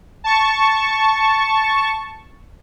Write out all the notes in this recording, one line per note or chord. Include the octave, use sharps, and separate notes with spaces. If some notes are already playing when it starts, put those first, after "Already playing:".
A5 C#6